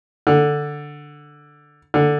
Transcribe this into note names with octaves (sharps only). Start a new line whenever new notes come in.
D3
D3